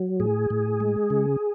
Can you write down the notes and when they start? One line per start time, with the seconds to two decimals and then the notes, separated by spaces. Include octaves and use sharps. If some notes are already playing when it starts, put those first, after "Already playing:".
Already playing: F#3
0.20 A2 G#4
0.50 A2
0.80 G#3
1.10 C#3